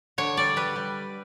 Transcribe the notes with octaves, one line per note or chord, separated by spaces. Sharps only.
D3 C#5
G3 D5
G3 B4
G3